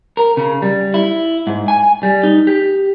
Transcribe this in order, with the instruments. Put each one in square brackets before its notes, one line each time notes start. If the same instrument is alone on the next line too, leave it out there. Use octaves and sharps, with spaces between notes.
[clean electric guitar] A#4
C#3
G3
E4
G#2
G#5
G3
D#4
G4